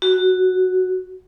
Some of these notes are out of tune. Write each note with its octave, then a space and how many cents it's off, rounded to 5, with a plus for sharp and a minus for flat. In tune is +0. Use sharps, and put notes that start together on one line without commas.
F#4 +0